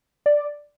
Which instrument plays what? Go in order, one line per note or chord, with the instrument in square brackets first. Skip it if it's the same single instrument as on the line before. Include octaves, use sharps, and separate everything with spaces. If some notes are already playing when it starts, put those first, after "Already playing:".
[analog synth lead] D5